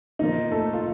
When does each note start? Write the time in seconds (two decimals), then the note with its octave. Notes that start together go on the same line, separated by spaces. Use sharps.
0.19 A#2 F3 A#3 D#4
0.51 A3 A4
0.73 F4